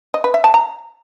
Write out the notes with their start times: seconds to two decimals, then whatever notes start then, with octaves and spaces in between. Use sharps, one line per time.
0.14 D#5
0.24 B4
0.34 E5
0.44 A5
0.54 A#5